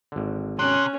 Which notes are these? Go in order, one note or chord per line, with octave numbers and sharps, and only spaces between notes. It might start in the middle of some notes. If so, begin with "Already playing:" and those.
G#1 D3
C3 C#4 F#6